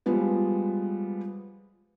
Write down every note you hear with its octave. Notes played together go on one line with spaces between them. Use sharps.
F3 G3 G#3 B3